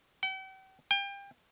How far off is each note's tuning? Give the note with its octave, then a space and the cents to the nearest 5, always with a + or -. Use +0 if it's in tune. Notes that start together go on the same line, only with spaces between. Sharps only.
G5 -45
G5 +30